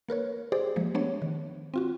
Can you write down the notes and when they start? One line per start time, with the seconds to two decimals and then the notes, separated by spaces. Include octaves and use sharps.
0.09 A#3 A#4 B4 C#5
0.52 G4 G#4 C5 D5
0.76 F3 G#3 A#3
0.95 A3 B3 D4 C#5
1.22 D#3
1.74 C4 F4 F#4